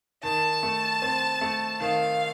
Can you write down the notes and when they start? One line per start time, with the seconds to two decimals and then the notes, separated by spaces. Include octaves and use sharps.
0.23 D#3 A5
0.63 A3
1.02 C4
1.41 A3
1.80 D#3 F5